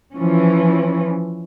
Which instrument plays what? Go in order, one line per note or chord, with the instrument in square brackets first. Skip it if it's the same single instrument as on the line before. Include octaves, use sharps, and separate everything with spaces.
[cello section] E3 F3 C#4